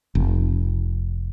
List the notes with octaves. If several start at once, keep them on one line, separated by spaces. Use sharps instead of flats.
F1